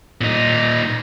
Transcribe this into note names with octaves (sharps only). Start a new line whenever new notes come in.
A#2 D#4